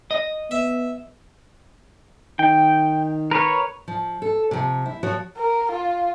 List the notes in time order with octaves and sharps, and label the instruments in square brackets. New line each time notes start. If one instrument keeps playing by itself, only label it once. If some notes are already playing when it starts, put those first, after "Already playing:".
[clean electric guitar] D#5
[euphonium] B3 [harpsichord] E5
[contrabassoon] D#3 [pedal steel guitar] G5
[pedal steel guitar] A#4 B4 C#5
[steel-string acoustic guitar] F3
A4
C3 F3
E4
F3 F#4 C#5
[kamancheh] A#4
F4